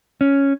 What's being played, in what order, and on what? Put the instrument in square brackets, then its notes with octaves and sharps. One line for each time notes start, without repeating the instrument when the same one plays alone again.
[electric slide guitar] C#4